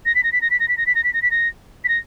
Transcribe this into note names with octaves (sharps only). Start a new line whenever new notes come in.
A#6
B6
A#6
B6
A#6
B6
A#6
B6
A#6
B6
A#6
B6
A#6
B6
A#6
B6
A#6